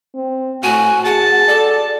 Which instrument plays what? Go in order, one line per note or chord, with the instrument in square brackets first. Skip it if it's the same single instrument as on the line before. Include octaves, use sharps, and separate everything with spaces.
[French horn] C4
[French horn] A2 [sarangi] F#4 [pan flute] G#5
[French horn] G#4 [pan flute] F#5 [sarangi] A5
[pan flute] A4 [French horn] D5